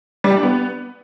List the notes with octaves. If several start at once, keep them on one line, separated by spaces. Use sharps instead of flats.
G3
G4
D4
B3